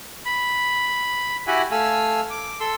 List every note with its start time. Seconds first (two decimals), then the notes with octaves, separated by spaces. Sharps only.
0.26 B5
1.47 E4 F#4 G4 E5 F#5 G#5
1.71 A3 F5 G#5 E6
2.30 D6
2.60 A4 C6 E6